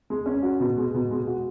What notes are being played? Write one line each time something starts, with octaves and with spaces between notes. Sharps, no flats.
G#3
C#4
F#4
B2
G#3
B2
G#3
F#4